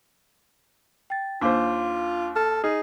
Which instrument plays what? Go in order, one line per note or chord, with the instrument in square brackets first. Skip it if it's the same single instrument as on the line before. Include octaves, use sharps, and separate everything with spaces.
[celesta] G5 A6
[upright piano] D#2 C5 [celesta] D4 F5 D6 [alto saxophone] F4
[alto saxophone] A4 [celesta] F6
[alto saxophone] D#4 [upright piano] G#4